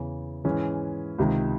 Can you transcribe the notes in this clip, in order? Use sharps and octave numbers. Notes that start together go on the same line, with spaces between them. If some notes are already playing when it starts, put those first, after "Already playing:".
Already playing: E2 C#3 E3
G#2 E3 G#3 C#4
C#2 C3 D#3